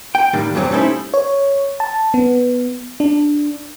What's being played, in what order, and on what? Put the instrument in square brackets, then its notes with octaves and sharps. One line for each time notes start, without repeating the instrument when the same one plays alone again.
[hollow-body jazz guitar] G5
A2 D#3 G3 A#3 D4
E2 G2 C3 F#3 G3 C4
G3 A3 C#4 D#4 E4 C5
[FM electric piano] C#5
A5
B3
D4